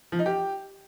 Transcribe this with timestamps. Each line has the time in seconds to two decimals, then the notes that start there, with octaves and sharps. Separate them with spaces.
0.12 F3
0.19 D#4
0.26 G4